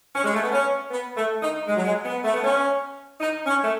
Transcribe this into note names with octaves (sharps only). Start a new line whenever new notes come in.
C#4
G#3
A3
B3
C#4
B3
A3
D#4
G#3
F#3
G#3
B3
A3
B3
C#4
D#4
C#4
A3